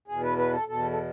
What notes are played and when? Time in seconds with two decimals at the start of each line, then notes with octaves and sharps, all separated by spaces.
0.08 E2 B2 G#4
0.22 B4
0.38 B4
0.53 A4
0.68 E2 B2 A4
0.91 A4